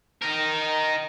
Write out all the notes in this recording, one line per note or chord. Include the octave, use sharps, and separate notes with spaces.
D#4 A#4